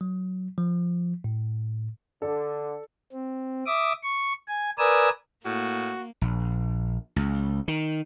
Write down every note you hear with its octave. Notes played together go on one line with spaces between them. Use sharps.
F#3
F3
A2
D3 A4 D5
C4
E5 D6 D#6
C#6
G#5
A#4 B4 D5 G#5 D#6 E6
A2 A#3 F#4
A#1
C#2
D#3